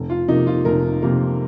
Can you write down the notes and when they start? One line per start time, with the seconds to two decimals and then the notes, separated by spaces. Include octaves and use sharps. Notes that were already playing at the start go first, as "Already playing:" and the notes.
Already playing: F1
0.10 F4
0.28 F2 C3 F3 A#3 D#4
0.47 F4
0.65 F1 A#4
1.02 F2 C3 F3 A#3 A#4